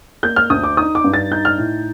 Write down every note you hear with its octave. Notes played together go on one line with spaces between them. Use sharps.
A#3 G6
F6
D2 D#6
D6
D#4 D#6
D6
G2
A6
D#4 G6
F6
A2